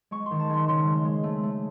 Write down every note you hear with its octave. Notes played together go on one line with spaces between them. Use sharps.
G#3 C#6
C6
D#3
A5
G#3 C6
C#3 C6
G#3
G#3
A3
A3